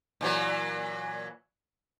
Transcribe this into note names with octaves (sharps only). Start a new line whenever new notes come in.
A#2 E3 F#3